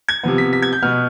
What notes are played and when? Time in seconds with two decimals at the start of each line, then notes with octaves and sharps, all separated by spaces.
0.09 G#6
0.23 C3 F3 B3
0.38 B6
0.53 B6
0.62 G#6
0.73 G6
0.83 B2 B3 F6